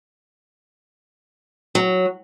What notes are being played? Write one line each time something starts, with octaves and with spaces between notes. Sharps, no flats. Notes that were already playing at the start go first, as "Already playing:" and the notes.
F#3